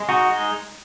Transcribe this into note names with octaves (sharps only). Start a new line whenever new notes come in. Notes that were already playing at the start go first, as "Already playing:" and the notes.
Already playing: G#3
D#4 F#4
G#3